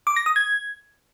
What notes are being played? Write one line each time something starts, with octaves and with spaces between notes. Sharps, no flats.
D6
A#6
D#6
G#6